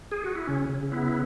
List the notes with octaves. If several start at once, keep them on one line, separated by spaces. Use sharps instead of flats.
G#4
F#4
E4
C#3 C#4
C#3
B3 E4